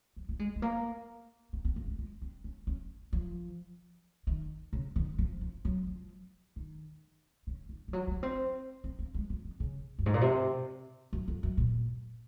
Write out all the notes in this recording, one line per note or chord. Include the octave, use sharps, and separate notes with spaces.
F3
A#3
G#3
G#3
A#3
C4
C4
A#3
G#3
G#3
C4
C#4
C#4
F3
D#3
C#3
D#3
F3
F3
F#3
F3
D#3
C#3
D#3
F3
F#3
G#3
A#3
C4
C4
A#3
G#3
F3
D#3
C#3
F#2
G#2
A#2
C3
F#2
F2
F#2
A#2